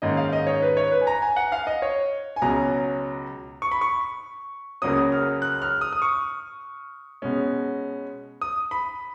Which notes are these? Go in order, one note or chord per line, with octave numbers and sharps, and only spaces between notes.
G#2 D#3 A#3 C#4 D#5
F5
D#5
C#5
B4
C#5
B4
G#5
A#5
G#5
F#5
F5
D#5
C#5
G#5
C#2 B2 F#3 C#4 A#5
C#6
B5
C#6
C#2 C#3 F#3 A#3 C#4 D#6
F6
F#6
F6
D#6
D#6
C#6
B2 G#3 C#4
D#6
B5